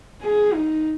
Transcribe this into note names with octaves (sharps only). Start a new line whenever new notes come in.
G#4
D#4